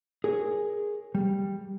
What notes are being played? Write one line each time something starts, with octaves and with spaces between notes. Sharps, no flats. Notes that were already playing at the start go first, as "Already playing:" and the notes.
G#4 A#4 C#5
G3